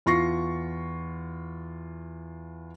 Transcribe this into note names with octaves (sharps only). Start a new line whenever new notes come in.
E2 F4 C#6 A#6 C7